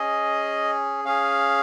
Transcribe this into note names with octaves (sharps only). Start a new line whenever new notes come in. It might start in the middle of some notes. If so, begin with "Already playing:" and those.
Already playing: C#4 G#4 D#5
C#4 G#4 F5